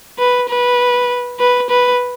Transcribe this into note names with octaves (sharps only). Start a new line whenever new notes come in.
B4
B4
B4
B4